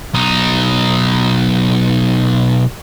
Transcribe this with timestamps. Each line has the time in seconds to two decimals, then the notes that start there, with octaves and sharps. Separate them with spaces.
0.14 B1 D#4